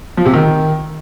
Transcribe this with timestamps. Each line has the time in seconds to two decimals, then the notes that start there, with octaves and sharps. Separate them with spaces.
0.17 F3
0.26 C3
0.34 D#3